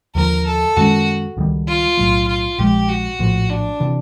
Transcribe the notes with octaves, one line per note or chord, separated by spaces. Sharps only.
D#2 D3 F3 A#4
A4
F#2 D#3 G#3 C#4 F#4
C#2 C3 D#3 G3
F4
B1 A2 F#3 A3
F4
A#1 A#2 F3 G#3 G4
F#4
A#1 A2 F3
D4
C3 E3